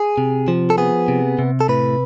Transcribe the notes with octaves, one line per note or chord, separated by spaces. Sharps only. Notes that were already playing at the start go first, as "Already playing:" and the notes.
Already playing: G#4
C3
F3
A4
B3 G#4
C3
C3
A4
A2 B4